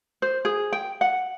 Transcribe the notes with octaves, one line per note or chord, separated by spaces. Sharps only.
C5
G#4
G5
F#5